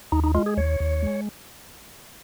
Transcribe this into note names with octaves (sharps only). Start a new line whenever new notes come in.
D#2 D#4
D#4
G#3 F4
G#4
D#2 C#5
D#2
G#3